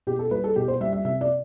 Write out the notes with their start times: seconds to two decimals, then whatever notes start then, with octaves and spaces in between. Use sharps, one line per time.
0.07 B2 G4
0.19 A4
0.31 G3 B4
0.44 A4
0.56 B2 G4
0.68 C5
0.80 G3 E5
0.93 E5
1.05 C3 E5
1.21 D5